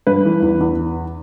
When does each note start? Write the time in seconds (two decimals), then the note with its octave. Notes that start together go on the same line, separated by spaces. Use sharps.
0.07 G2 B4
0.25 E3
0.42 E2
0.60 E2